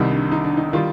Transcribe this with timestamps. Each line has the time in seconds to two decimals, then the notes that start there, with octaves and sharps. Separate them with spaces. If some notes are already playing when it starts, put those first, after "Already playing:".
Already playing: C2 C3 D#3 G3 D#4
0.11 D4
0.32 D#4
0.44 D4
0.57 D#4
0.73 D#3 G3 F4